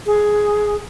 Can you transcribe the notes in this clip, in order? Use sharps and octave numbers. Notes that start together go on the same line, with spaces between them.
G#4